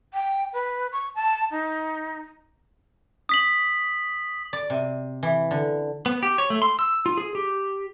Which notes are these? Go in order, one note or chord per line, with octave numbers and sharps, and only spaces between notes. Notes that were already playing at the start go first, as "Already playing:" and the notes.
G5
B4
C#6
A5
D#4
D#6 B6 F#7
D5
C3
E3
D3
B3
G4
C#5
A3
C6
E6
F4
G#4
G4